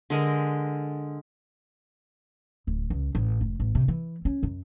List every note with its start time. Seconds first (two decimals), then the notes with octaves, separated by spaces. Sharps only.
0.10 D3 G#3 A#4
2.67 D1
2.90 C#2
3.15 A1
3.41 F1
3.60 A1
3.75 C3
3.88 E3
4.25 C#4
4.43 F#2